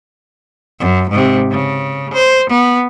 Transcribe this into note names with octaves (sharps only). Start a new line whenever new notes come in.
F#2
G#2 C3
C#3
C5
B3